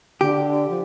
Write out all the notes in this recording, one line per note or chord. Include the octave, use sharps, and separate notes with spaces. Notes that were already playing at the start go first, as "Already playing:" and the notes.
D3 G4
F3